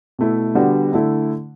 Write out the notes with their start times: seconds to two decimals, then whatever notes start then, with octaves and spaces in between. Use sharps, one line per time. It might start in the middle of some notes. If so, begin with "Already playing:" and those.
0.19 B2 A3 E4
0.55 D3 G3 B3 D4 F#4
0.93 D3 A3 E4